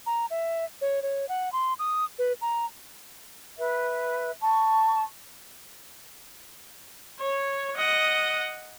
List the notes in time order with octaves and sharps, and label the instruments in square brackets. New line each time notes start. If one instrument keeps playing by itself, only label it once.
[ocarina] A#5
E5
C#5
C#5
F#5
C6
D#6
B4
A#5
[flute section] B4 E5
A5 C#6
[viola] C#5
D#5 F#5